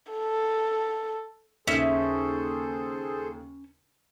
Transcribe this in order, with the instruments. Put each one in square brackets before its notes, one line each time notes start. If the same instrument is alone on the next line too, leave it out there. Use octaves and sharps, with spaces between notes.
[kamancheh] A4
[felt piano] D#2 C#3 [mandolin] C#4 [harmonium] G#4 A4 C5 [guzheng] E5